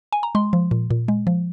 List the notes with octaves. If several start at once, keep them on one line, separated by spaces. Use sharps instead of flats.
G#5
A#5
G#3 C6
F3
A#2
A#2
G#3
F3